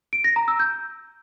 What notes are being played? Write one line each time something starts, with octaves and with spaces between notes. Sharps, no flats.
D7
A#6
A#5
E6
G6